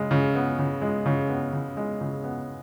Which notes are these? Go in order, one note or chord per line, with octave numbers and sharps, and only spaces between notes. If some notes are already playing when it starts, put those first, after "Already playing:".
Already playing: C#3 G#3
C#3
B3
C#3
G#3
C#3
B3
C#3
G#3
C#3
B3